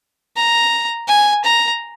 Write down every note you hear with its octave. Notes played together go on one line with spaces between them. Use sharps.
A#5
G#5
A#5